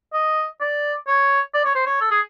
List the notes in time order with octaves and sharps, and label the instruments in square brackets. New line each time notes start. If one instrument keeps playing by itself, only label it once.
[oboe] D#5
D5
C#5
D5
C#5
C5
C#5
A4
G#4